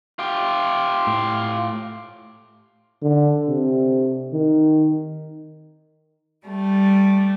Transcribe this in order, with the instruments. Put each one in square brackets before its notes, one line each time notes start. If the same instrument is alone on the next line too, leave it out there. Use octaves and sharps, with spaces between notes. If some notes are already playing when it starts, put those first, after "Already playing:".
[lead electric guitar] F4 G4
[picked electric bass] A2
[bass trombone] D3
C3
D#3
[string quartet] G3 A3